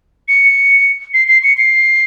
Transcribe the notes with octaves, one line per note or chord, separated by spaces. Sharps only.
C#7
C7
C7
C#7
C7